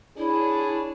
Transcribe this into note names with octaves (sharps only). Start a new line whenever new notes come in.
D4 E4 G#4 C#5